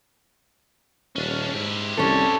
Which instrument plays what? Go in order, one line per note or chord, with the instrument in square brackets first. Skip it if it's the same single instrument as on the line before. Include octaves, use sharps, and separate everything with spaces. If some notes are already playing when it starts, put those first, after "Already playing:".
[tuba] D#1 [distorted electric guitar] C#4 D4
[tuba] G#2 [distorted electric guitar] E4 G4
[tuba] C2 [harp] C#4 A4